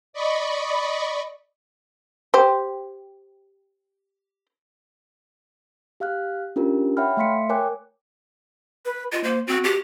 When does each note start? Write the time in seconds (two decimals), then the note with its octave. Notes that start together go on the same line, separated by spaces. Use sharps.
0.13 D5 D#5 B5 C#6
2.34 G4 C5
6.00 G4 F5 F6 F#6
6.56 C#4 D4 F4 G4 A#4
6.97 C#5 E5 F#5 G5 B5 F6
7.17 A3 E5 F5 C6 B6 C#7
7.49 A#4 C#5 G5 G#5 D6 F#6
8.85 B4
9.12 F4 D#5
9.24 A#3 C5
9.47 C4 F#4
9.64 G4